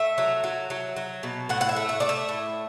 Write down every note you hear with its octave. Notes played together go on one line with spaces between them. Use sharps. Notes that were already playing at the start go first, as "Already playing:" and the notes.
Already playing: A3 E5
F#3
F#3
F#3
F#3
B2
A2 F#5
F#5
E5
A3
E5
A3 D5
E5
A2